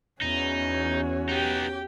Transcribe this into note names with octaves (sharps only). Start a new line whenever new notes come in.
E2 C#4 D#4 F#4
B3 D#4 G4 G5